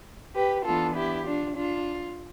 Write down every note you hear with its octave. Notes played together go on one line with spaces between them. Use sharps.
G4 B4
E3 B3 D4 F4 A4
E4 G4
D4 F4
D4 F4